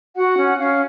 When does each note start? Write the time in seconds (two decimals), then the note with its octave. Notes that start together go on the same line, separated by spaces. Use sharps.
0.15 F#4 F#5
0.38 C#4
0.58 C#4 F5